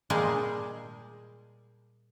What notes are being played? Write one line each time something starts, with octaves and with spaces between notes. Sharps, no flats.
A#2 G3 G#3 G#4 A5